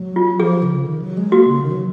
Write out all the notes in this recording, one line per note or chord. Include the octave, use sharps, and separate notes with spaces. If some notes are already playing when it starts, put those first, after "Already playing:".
Already playing: F#3
F4
F3 G#4
C#3
D#3
F#3
G#3
A#3 F#4
C#3
D#3
F#3